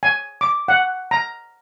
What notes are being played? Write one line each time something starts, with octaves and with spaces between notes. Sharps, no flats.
G#5
D6
F#5
A#5